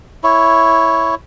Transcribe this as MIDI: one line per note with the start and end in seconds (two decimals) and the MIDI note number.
0.24 1.15 64
0.24 1.15 73